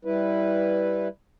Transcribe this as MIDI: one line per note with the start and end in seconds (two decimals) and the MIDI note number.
0.05 1.08 55
0.05 1.08 64
0.05 1.08 71